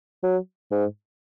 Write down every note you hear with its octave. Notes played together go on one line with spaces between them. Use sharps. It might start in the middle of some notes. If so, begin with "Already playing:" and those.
F#3
G#2